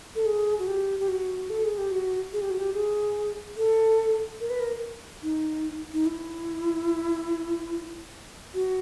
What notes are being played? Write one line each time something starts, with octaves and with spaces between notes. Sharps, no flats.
A4
G#4
F#4
G4
G4
F#4
A4
G#4
G4
F#4
G#4
G4
F#4
G4
G#4
A4
A#4
B4
A#4
D#4
D#4
E4
F#4